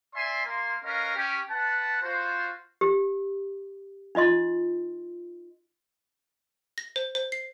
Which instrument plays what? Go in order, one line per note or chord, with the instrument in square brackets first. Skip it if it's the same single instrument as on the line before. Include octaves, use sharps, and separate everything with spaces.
[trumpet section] D5 E5 G#5 C6
A#3 C6
C#4 A#4 B4 D#5 F5
C#4 G4
B4 F#5 A5
F4 F#4 C5
[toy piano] G4
D#4 F4 D#5 C6
[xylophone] A#6
C5
C5
C7